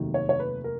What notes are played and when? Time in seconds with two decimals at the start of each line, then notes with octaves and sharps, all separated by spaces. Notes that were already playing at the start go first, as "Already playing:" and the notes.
Already playing: F1 D#2 D#3 F#3
0.14 C#5
0.29 C#5
0.40 B4
0.64 A#4